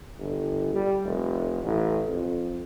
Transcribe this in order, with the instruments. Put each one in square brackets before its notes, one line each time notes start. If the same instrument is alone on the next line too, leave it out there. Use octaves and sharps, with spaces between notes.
[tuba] G1
G3
F1
A1
F2